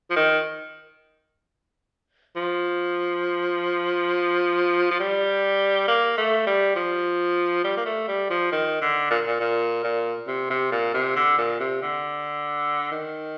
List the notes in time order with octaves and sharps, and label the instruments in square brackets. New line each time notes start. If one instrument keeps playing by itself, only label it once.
[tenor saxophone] F3
D#3
F3
F3
G3
A#3
A3
G3
F3
G3
A#3
A3
G3
F3
D#3
D3
A#2
A#2
A#2
A#2
C3
C3
A#2
C3
D3
A#2
C3
D3
D#3